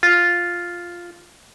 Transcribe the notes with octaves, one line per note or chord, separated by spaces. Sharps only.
F4